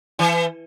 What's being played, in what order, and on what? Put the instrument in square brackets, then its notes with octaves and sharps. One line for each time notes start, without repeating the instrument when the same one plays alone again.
[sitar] E3